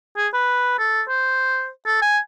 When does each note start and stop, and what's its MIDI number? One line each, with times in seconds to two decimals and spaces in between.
0.17 0.28 68
0.34 0.76 71
0.78 1.02 69
1.09 1.69 72
1.86 1.99 69
2.02 2.19 80